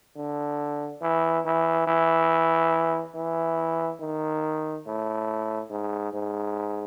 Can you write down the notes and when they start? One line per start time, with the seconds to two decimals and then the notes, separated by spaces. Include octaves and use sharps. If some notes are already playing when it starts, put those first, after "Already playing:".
0.16 D3
1.02 E3
1.45 E3
1.87 E3
3.15 E3
4.01 D#3
4.86 A2
5.71 G#2
6.13 G#2